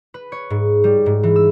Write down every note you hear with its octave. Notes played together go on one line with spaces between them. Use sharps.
B4
C#5
G#2
G3
G#2
E3
E6